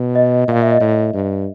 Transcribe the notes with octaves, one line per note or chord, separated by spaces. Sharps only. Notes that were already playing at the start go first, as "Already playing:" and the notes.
Already playing: B2
D#5
A#2 F5
E5
D#5
A2 D5
G2